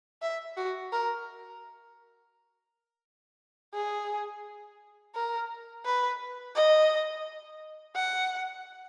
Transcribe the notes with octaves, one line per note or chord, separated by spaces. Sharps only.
E5
F#4
A#4
G#4
A#4
B4
D#5
F#5